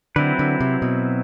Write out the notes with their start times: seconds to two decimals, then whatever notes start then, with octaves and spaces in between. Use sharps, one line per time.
0.16 D3 F#3 C4 E4 B4
0.39 D3
0.61 C3
0.82 B2